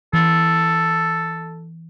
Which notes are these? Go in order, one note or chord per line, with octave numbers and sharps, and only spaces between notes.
E3 A4